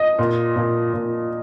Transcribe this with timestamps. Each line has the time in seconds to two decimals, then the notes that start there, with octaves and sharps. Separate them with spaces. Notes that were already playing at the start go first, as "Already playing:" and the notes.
Already playing: D#5
0.19 A#2
0.56 A#2
0.94 A#2